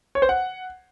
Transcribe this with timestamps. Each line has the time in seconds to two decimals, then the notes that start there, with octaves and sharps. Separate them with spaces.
0.15 C#5
0.22 C5
0.29 F#5